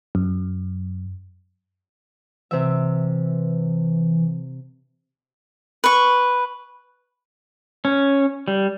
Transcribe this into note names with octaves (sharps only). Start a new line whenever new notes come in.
F#2
C3 E3 E5
B4 C#6
C#4
G3